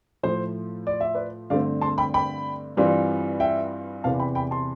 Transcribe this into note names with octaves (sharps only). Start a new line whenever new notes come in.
A2 F3 A3 C5
D5
E5
B4 D5
G2 D3 A3 C4 D5 F5
A5 C6
G5 B5
G5 B5
G2 E3 G3 C4 F4
E5 G5
E2 C3 E3 F5 A5
G5 B5
G5 B5
A5 C6